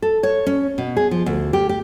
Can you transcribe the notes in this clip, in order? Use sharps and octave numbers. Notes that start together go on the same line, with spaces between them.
A4
C#5
C#4
B2
G#4
F3
D2
G4
G4